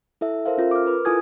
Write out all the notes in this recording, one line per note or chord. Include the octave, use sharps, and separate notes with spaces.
E4 A4 E5
A4 A#4 C5 E5 F5
C#4 F4 A4 A#4
D6 F6
A#4 B4
E4 F4 A4 G#5 D#6 G#6